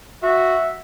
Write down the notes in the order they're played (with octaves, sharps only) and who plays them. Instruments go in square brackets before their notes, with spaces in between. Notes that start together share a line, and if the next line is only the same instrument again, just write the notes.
[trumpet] F#4 [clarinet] E5